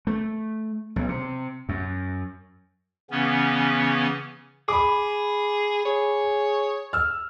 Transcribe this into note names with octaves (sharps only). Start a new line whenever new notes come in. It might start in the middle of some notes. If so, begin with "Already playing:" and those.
A3
B1
C3
F#2
C#3 E3 B3 C#4
G#4 B5 D6
G#4 C#5
E6 F6